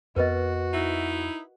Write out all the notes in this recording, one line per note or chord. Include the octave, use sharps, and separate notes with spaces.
F2 B3 F#4 A#4 B4 D#5
D#4 E4